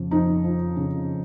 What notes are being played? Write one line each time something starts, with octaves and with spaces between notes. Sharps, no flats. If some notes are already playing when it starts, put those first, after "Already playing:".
Already playing: F2 C#3
F2 D#4
F3
C#3